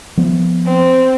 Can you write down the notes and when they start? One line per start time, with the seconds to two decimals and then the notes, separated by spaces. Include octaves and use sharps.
0.17 F3 B3
0.65 C4